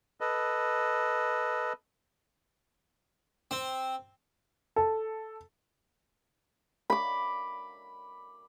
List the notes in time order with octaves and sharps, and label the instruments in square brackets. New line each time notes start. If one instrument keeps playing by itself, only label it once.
[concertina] A4 B4 D#5
[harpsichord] C4
[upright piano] A4
[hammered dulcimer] B5 D6